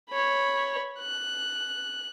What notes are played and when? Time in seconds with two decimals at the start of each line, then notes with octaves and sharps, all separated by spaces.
0.10 C#5 B5
1.00 F#6